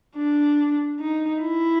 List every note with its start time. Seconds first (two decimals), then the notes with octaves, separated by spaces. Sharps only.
0.16 D4
0.99 D#4
1.42 E4